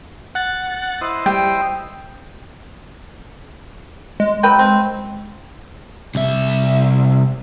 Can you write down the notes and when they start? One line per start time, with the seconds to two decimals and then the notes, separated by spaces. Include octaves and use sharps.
0.35 F#5 F#6 A6
1.01 E4 C5 D#5
1.26 G3 G5
4.20 G#3
4.43 F#3 B4 G5
4.59 C4
6.15 C2 E5